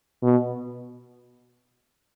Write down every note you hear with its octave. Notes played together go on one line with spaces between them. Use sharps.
B2